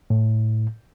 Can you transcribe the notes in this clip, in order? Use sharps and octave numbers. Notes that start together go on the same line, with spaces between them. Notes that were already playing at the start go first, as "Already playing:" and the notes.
A2